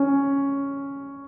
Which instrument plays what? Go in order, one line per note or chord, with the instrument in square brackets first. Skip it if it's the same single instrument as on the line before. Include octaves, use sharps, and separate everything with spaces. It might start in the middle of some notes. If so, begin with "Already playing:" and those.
Already playing: [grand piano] C#4